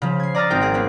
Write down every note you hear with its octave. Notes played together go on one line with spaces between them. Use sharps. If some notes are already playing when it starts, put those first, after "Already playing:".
C#3 F3
G#6 C7
D5 A#5 D#6 F6 A6
G#1 C4 D#4 A#4 G5 D7
A#3 G#4
A#3 B3 C#4